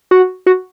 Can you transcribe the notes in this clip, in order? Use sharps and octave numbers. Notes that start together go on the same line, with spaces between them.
F#4
F#4